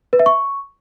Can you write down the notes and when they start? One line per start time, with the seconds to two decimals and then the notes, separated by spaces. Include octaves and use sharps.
0.13 B4
0.19 E5
0.26 C#6